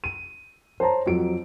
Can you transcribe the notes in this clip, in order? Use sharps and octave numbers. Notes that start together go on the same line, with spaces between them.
D#7
C5 C#5 A5 A#5
F2 F#3 D7